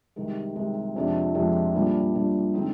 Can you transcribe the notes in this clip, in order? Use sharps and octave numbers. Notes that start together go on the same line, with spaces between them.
C2 C3 D#3 G#3
C2 C3 D#3 G#3
F2 C3 F3 G#3 D4
F2 C3 F3 G#3 D4
A#2 G3 D4
A#2 G3 D4
D3 G#3 C4 D#4